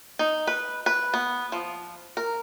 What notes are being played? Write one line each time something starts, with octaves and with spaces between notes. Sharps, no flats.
D#4
B4
B4
B3
F3
A#4